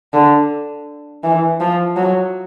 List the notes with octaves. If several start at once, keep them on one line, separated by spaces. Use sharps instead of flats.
D3
E3
F3
F#3